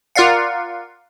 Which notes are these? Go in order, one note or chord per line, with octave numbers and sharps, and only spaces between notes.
F4 A#4 D5 F5 F#5